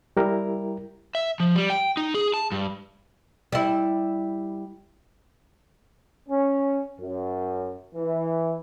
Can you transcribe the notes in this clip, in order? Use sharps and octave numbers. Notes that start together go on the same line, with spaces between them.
G3 E4 G4 A#4
E5
F3
G3
G5
D#4
G#4
A5
G2
G3 E4
C#4
F#2
E3